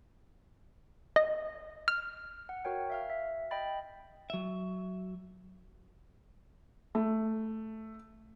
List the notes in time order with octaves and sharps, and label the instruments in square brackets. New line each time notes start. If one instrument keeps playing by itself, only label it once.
[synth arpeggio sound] D#5
F6
[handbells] F#5
F#4 A#4 C#5 G5
E5 F5 F6
E5
D#5 G5 B5 A6
[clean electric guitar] F#3 E5
[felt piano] A3